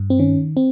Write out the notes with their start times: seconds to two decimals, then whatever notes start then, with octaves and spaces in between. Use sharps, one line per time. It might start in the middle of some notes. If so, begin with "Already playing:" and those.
Already playing: G2
0.10 C4
0.19 D#3 C#4
0.57 C4